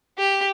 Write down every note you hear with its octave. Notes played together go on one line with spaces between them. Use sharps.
G4